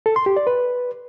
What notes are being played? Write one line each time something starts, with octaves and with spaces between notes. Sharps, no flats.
A4
C6
G4
D5
B4